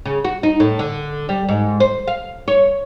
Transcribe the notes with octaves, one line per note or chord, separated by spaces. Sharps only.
C#3
F#4
D#4
A2
D3
G3
G#2
C5
F5
C#5